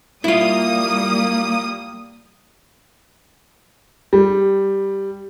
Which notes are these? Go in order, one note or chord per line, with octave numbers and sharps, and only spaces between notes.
G3 A#3 E4 F4 D#6
G3